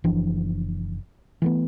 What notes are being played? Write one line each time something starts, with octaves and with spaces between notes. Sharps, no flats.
F#1 E3 F3 D4
E3 A3 B3